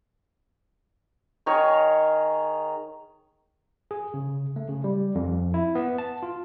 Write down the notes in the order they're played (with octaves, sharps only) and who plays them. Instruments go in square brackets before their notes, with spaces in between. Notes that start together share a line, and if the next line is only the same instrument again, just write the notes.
[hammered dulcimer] D#3 G#4 A#4 C#5
[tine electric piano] G#4
C#3
A3
C#3
G3
F2
E4
B3
A5
F4